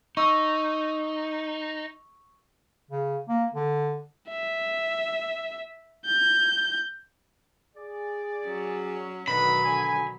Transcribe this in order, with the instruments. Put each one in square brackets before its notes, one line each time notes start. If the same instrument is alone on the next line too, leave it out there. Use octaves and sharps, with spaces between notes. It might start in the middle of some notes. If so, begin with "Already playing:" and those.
[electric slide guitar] D#4 [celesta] C#6 E6
[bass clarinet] C#3
A#3
D3
[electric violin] E5
G6
[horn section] G#4 D5
[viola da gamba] F#3 C#4
[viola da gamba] B2 D#3 F#3 [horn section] D3 D#4 B4 [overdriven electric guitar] B5
[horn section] D3 G#5